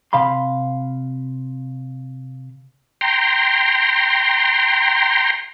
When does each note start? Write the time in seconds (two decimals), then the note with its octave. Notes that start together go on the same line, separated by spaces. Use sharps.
0.13 C3 F5 B5 C6
3.01 G5 A#5 C6